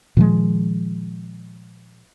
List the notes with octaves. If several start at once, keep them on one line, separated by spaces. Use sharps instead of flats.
A#2 D#3 F3 G#3